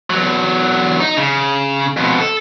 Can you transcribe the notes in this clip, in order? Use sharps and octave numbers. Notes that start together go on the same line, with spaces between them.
E2 F#3
D#4
C#3
F2 B2
A4